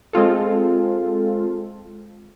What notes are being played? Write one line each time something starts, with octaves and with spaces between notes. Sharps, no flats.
G#3 C4 F4 A4